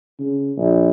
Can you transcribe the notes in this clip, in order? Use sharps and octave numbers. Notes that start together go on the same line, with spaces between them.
C#3
A#1